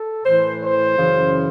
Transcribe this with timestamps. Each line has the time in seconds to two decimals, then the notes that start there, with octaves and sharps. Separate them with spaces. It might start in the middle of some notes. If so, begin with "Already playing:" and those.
Already playing: A4
0.24 A2 E3 C5
0.61 C5
0.98 F#2 C#3 E3